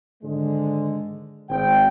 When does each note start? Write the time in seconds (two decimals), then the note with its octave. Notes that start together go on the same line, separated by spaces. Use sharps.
0.23 G#2 D3 D#3 G#3
1.50 G#1 G5